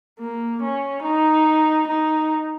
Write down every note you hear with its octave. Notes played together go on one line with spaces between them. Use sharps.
A#3
C#4
D#4
D#4